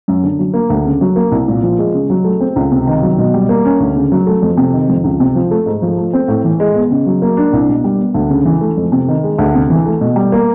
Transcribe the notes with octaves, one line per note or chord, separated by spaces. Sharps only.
F#2
D3
F#3
A#3
D2
C#3
F#3
A#3
C2
A#2
F3
G#3
C#3
F#3
A3
C4
C#2
C3
D#3
F#3
B2
G3
A#3
C#4
D2
C#3
F#3
A3
F2
C3
D#3
F2
C#2
C3
F3
A3
G#2
F3
A3
C4
A2
E3
G#3
B3
C#3
F#3
A#3
D4
C2
B2
G3
B3
D2
C#3
E3
A3
F2
C3
D#3
G#3
D2
C3
E3
A3
B2
G3
A#3